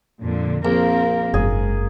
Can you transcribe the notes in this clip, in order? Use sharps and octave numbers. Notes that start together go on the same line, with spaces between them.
F2 A#2 D3
A#1 A#3 C4 A#4
F#1 G#2 G#4